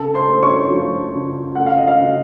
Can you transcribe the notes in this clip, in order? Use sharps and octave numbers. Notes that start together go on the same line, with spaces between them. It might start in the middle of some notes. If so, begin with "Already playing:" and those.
Already playing: C#3 A4 A5
C5 C6
A3
C#5 C#6
F3
C#3
A3 F#5
F5
D#5
F5
C#3